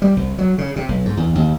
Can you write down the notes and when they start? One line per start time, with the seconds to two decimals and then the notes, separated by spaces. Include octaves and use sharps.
0.02 G3
0.16 C2
0.38 F#3
0.58 C#3
0.76 C3
0.89 B1
1.05 G#2
1.17 E2
1.35 D#2